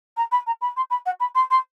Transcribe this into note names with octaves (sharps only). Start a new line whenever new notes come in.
A#5
B5
A#5
B5
C6
B5
F#5
B5
C6
C6